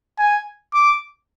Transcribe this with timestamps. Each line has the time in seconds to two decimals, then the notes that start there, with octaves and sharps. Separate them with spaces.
0.19 G#5
0.74 D6